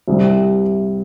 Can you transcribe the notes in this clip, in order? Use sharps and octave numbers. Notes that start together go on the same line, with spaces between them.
C2 C3 G3 C4